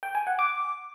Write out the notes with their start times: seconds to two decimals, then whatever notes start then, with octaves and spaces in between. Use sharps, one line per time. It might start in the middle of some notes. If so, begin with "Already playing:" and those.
0.03 G5
0.15 G#5
0.27 F#5
0.39 D6